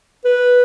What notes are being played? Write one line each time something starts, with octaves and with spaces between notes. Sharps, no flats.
B4